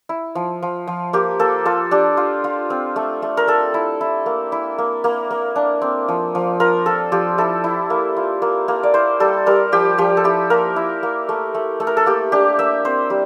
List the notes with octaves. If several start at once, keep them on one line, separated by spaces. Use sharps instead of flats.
E4
F3
F3
F3
A#3 G4
A#3 A4
F4 A4
D4 G4
F4
F4
C4
A3
A3
A#4
A3 A4
E4
E4
A#3
E4
A#3
A#3
A#3
D4
C4
F3
F3
F4 A#4
F3 A4
F3 G4
E4 A4
E4
A#3
F4
A#3
A#3
D5
E4 C5
G3 A4
G3 A#4
F3 G4
F3 G4
A4
E4 G4
A#3 A#4
E4
A#3
A3
A3
A3
A#4
A4
A#3 G4
D4 G4
A#3 E5
C4 C5
G3